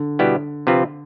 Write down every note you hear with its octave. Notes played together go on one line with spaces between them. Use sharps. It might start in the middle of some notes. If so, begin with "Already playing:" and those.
Already playing: D3
B2 G3 B3 E4 G4
C3 F3 C4 F4 B4